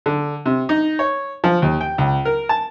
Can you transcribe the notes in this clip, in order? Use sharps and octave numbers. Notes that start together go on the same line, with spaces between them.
D3
C3
D#4
C#5
F3
D#2
G5
C#2
A#4
A5